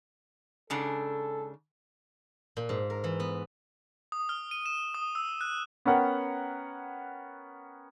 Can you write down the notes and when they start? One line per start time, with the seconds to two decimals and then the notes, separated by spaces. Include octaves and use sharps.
0.70 G#2 C#3 D4 A4
2.57 A#2
2.69 G#2
2.90 A#4
3.04 E3
3.20 B3
4.12 D#6
4.29 F6
4.51 D#7
4.66 E7
4.94 D#6
5.15 E6
5.41 F#6
5.85 B3 C#4 A#4 F#5 G5